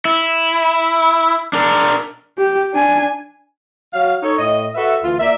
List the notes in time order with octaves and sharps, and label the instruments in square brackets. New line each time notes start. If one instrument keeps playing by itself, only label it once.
[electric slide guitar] E4
D4 A#4
[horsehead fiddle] G4
D4 G#5
[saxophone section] F#3 F5
D#4 A4 C#5
A2 D#5
F#4 A4 B4 E5
D2 E3 F4
A#3 D5 E5